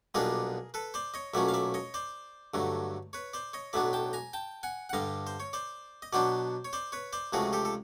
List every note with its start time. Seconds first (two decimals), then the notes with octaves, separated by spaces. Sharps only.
0.14 B1 A#2 G3 B3 D4 G#4 A#4
0.74 A4 B4
0.94 C5 D5
1.14 C#5 D#5
1.34 B1 A#2 F#3 A3 C#4 D5 E5
1.48 F5
1.54 D5 E5
1.74 C#5 D#5
1.94 C5 D5
2.54 G2 D3 F#3 A3
3.13 B4 C#5
3.34 C5 D5
3.53 C#5 D#5
3.73 B1 A2 F#3 B3 D4 D5 E5
3.93 G5 A5
4.13 G#5 A#5
4.33 G5 A5
4.63 F#5 G#5
4.89 F#5
4.93 G2 D3 G3 D#5 F5
5.27 C5
5.40 C#5
5.53 C5 D5
6.02 D#5
6.13 B2 F#3 B3 D4 C5 D5
6.65 C#5
6.73 C5 D5
6.92 B4 C#5
7.13 C5 D5
7.33 C#2 C3 F3 A3 F#4 G#4
7.53 G4 A4
7.65 A4